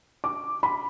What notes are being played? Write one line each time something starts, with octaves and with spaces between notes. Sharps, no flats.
D6
B5